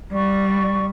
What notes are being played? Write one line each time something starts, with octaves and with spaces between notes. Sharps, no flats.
G3 D5 C#6